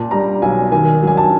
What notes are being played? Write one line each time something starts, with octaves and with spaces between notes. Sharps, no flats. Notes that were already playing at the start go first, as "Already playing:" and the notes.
Already playing: A#2 A5
G3 A#5
B1 G#5
D#3 G#5
F#3 G#5
A5